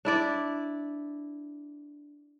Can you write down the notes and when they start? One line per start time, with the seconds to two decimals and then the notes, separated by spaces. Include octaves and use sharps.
0.05 D4 E4 D5